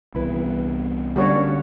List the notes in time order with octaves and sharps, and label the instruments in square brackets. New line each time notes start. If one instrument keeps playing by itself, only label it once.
[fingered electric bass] C2 E3 B3 [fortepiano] E4 B4
[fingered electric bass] D3 [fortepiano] G3 C#4 D4 [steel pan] A#3 F#4 C#5